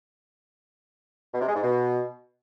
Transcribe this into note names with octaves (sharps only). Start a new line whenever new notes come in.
B2
C3
G#3
G#2
B2